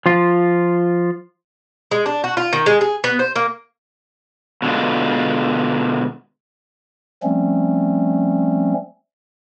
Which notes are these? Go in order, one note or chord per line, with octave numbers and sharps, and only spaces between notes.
F3 F4
G#3
D4
F#4
F4
D#3
G#3
G#4
B3
C5
A#3
B2 D3 G#3 F4
F3 G3 A3 C4 C#4